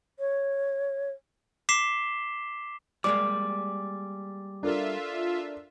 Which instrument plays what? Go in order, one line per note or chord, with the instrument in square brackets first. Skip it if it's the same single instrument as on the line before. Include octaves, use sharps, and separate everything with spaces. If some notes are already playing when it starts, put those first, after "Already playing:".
[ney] C#5
[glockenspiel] D6 B6 C7 E7 G7
[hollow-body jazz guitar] G3 G#3 A#3 [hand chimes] D6
[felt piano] D4 A4 A#4 [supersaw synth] F4 E5